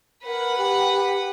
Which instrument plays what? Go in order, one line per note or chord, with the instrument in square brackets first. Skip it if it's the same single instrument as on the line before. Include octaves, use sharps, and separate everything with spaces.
[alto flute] A#4 [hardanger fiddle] B4 F#5
[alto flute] G4